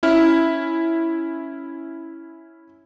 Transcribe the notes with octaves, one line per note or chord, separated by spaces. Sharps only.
C#4 E4 F6